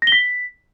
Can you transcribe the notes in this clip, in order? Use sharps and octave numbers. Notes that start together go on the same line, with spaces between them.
A#6
G7
B6